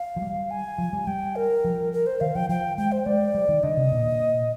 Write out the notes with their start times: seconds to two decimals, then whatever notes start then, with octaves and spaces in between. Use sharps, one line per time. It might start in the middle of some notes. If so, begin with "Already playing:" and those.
Already playing: F5
0.16 F3
0.22 G3
0.50 G#5
0.78 F3
0.93 G3
1.07 G3 G5
1.36 A#4
1.64 F3
1.93 A#4
2.06 C5
2.21 D#3 F5
2.35 F3 G5
2.49 F3 G5
2.77 G#3 G5
2.92 C5
3.06 G#3 D5
3.34 G3
3.49 D#3
3.63 D3 D#5
3.77 C3
3.92 A#2